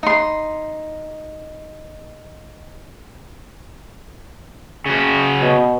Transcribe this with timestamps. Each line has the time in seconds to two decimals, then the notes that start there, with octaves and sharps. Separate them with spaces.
0.03 D#4 C6
4.86 C#3 F#4
5.42 B2